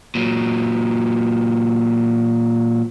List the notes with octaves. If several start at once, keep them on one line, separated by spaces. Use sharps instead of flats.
A#2 F#3